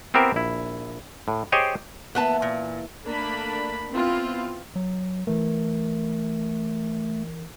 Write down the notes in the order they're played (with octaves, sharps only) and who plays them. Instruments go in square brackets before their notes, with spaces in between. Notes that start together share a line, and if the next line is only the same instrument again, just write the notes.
[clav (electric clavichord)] B3 C4 E4 G4 A#4 C5
A#1 E4
A2
G4 G#4 C5 C#5 D#5 G5
[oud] E3 A#3 [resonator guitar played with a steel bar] B3 B4 A5
[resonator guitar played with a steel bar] A#2
[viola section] A3 A#3 D4 D5 B5
B3 C4 E4 F4
[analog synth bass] F#3
[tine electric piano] E3 A#4 [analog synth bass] A3